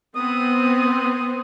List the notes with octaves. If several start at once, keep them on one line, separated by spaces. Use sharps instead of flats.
B3 C4 D#6